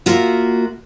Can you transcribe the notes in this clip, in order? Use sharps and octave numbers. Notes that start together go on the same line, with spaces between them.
A#3 F4 F#4 E5